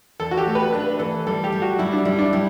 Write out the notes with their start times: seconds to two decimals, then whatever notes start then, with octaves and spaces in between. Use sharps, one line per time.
0.19 E2 A4
0.31 F#4
0.37 G4
0.46 A3
0.55 B4
0.73 D4 B4
0.99 E3 A4
1.27 G3 A4
1.44 G4
1.52 G3
1.62 F#4
1.79 G3 E4
1.93 D4
2.05 G3 E4
2.19 D4
2.33 G3 E4